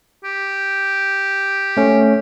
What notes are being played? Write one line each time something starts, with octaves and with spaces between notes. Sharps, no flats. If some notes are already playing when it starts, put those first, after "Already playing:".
G4
A3 C#4